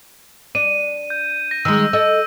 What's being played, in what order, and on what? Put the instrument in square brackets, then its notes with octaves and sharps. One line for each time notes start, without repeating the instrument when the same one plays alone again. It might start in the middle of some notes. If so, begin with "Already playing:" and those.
[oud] D4 [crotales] D#7
[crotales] G6
A#6
[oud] D#3 G#3 [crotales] E6
[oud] A4 D#5 [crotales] E6